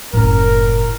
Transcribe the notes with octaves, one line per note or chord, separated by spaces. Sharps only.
F#1 A2 C#4 A#4